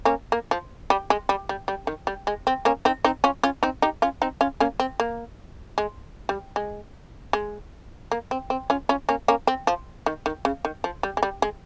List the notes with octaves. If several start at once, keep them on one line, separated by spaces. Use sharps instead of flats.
A#3 C#4
A#3
F3
G3
G#3
G3
G3
G3
D#3
G3
G#3
C4
A#3 C#4
C4 D#4
C4 D#4
C#4 F4
C#4 F4
C4 D#4
D#4 G4
C#4 F4
C4 D#4
C#4 F4
A#3 C#4
C4
A#3
G#3
G3
G#3
G#3
A#3
C4
C4
C#4 F4
C#4 F4
A#3 C#4
A#3 C#4
C4
F3
D#3
D#3
C#3
D#3
F3
G3
G#3
G3
G#3